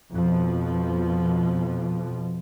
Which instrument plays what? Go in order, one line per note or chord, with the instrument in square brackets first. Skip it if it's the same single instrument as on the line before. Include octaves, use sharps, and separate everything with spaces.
[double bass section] F2 B2 F3